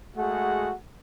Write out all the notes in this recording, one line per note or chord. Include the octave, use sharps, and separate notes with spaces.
G#3 A3 F#4 G#4 F#5